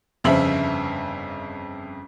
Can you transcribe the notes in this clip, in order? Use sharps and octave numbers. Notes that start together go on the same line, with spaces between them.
G1 F2 C#3 C5 E5 F#7